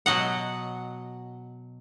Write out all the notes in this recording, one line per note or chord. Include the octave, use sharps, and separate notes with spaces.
B2 F#3 D#5 F#5